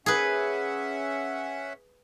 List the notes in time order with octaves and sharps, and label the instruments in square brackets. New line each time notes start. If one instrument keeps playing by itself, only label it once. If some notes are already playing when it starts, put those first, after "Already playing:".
[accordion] C#4 E5 F#5 [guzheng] G#4 B4